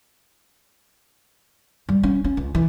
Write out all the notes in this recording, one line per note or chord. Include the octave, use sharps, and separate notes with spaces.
G3
C#4
C#4
C#2
E3